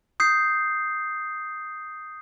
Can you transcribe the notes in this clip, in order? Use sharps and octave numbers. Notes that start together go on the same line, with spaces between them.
D#6 G6 C7